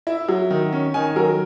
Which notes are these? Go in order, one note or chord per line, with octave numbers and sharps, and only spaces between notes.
E4 E5
F#3
D#3
C#4
D#3 G#5
F#3 A#4